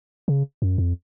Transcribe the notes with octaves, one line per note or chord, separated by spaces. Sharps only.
C#3
F#2
F2